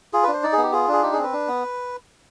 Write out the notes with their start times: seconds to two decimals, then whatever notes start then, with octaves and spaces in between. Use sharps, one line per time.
0.13 F4 G#4
0.23 D4 B4
0.33 C5
0.43 D#4 D5
0.53 G#4
0.58 B3
0.63 G4
0.72 F4 G#4
0.88 D4 G#4
1.03 D#4 G4
1.13 C4 G#4
1.23 B4
1.33 D4
1.48 B3